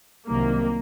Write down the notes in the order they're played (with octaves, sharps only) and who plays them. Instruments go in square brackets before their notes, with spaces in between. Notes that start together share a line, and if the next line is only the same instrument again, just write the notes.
[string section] C2 C3 D#3 F#3 A#3